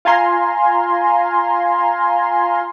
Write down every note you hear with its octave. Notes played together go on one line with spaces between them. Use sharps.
F4 F5 G#5 A#5 C6